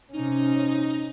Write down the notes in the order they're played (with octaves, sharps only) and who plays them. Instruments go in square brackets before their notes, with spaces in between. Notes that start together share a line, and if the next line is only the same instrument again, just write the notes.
[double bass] C3 C#4 [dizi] D#4